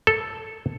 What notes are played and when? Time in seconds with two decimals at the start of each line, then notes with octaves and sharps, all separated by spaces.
0.07 A4